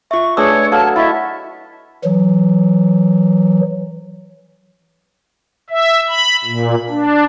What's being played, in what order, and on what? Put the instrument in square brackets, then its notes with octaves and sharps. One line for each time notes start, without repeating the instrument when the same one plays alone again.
[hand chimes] F4 E5 [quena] C#6
[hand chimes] A3 B4 E6 [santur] D4 G#4 [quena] C#5
[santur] F#3 A4 F5 [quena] A5 [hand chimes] G#6
[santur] E4 [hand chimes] D#5 C#6 A6 [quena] E5
[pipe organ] E3 F#3
E5
B5
A#2
D4